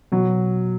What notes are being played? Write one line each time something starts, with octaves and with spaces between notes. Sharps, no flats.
B2 F#3